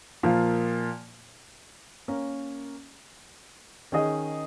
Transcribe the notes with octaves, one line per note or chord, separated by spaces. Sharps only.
A#2 F3 A#3 F4
A#3 C#4 A#4
D#3 C#4 G#4 D#5